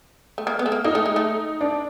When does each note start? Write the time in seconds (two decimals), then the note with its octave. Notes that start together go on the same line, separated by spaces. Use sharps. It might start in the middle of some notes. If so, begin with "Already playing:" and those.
0.38 A3
0.47 A#3
0.59 B3
0.66 A3
0.72 A#3
0.84 A#3 D#4
0.95 A3
1.06 G#3
1.16 A3
1.61 D4